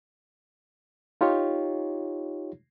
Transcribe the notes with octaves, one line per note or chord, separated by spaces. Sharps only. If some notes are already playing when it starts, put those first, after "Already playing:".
D#4 F4 G4 C#5